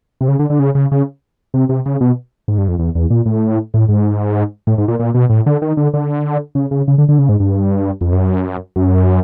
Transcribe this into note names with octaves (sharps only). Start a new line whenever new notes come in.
C3
C#3
D3
D3
C#3
C#3
C#3
C3
C3
C#3
B2
G#2
G2
F2
E2
E2
A#2
A2
A2
G#2
A2
G#2
A#2
A#2
B2
A2
D3
D#3
D3
D3
C#3
C#3
C#3
D3
D3
C#3
G#2
G2
F2
F#2
F#2